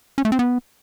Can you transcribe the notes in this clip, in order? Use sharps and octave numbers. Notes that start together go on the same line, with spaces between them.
C#4
A3
C4
B3